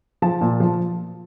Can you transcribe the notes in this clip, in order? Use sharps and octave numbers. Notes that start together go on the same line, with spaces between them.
F3 A5
A#2
F3